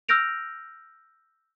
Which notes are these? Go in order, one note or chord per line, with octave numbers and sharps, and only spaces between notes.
E6 F6 G6 A#6 D7 F7